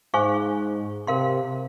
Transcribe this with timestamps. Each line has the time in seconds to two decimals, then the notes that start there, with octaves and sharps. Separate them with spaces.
0.14 G#2 G#4 C5 F5 G#5 C#6
1.07 C3 A#4 F5 C6